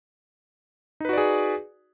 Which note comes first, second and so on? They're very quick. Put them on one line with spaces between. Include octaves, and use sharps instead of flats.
D#4 B4 F#4 D5 G#4